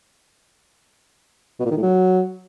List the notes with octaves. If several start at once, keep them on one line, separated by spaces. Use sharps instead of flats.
B2
A#2
D#3
A2
F#3